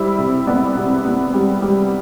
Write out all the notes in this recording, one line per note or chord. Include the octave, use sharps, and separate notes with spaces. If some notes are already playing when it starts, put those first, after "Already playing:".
Already playing: G3 E4 C5
C3
B3 D5
C3
B3
G3
G3